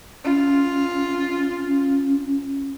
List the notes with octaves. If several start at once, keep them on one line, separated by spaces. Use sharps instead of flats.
C#4 F4